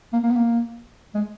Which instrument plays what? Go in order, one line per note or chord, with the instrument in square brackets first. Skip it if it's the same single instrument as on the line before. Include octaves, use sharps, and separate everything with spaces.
[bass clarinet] A#3
A#3
B3
A#3
G#3